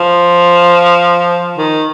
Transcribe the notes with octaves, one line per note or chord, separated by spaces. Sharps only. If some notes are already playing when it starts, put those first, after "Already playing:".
Already playing: F3
D#3